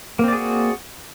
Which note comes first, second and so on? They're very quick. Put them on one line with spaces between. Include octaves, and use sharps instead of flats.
A#3 C4 D5 G#4 F#4